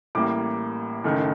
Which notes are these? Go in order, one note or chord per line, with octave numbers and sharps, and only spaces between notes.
A1 A2 G3 A#3 D6
F#1 F#2 D#3 A3